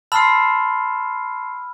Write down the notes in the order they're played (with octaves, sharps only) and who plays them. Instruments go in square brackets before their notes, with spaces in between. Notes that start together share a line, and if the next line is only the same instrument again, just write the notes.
[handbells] A5 C6 C7 [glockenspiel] B5 E6 F6